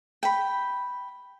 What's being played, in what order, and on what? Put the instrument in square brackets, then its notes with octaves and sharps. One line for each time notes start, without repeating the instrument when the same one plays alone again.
[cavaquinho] G5 B5